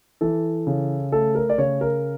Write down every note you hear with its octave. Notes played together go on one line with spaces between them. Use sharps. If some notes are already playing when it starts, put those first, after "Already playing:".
E3 A4
C#3
A3 A4
A#4
D5
C#3 C#5
A#4